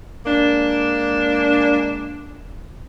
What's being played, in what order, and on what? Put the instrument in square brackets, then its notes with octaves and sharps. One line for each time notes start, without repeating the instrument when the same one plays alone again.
[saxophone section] G#3 A#3 D4